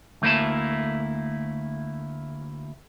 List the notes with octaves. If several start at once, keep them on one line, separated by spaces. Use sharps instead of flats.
D2 A3 A#3 E4 A5